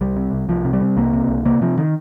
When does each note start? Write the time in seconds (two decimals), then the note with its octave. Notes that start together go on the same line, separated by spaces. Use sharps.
0.01 C2 G3
0.16 C3
0.33 C2
0.49 C2 F3
0.65 C3
0.73 G3
0.81 C3
0.97 C2 A#3
1.13 C3
1.29 C2
1.45 C3 A#3
1.61 C3 F3
1.78 D#3